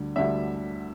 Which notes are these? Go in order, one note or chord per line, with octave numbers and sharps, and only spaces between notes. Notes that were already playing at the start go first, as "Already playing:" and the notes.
Already playing: D2 D3 G3
D2 D3 G3 E5